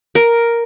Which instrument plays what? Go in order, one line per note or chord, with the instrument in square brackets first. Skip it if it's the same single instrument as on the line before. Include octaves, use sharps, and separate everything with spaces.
[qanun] A#4